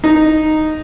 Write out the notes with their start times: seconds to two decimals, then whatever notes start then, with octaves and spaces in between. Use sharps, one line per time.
0.04 D#4